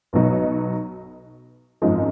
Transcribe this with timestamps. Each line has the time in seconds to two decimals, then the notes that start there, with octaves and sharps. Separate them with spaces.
0.13 B1 B2 F#3 B3 D#4
1.82 G#1 F#2 F3 G#3 D#4